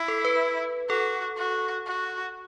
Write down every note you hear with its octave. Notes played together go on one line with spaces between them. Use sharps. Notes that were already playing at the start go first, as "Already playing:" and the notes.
Already playing: E4
A4
B4
F#4 A4
F#4
F#4